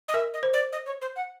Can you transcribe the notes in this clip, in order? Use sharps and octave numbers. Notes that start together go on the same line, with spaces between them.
D#5
A#4 E5
D#5
C5
D5
D#5
C#5
C5
F#5